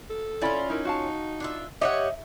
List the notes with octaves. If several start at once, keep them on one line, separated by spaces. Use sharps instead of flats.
A4
C#4 E4 F4 D5 B5
D#4 E4 A#4
F#4 F5 A5
D4 F4 E5
G4 C#5 D#5 E5 F#5